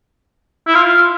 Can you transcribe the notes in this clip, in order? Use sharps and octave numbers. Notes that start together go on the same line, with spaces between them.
E4
F4